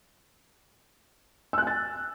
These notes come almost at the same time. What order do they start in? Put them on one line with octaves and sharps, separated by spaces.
E6 F#6 G#5 A6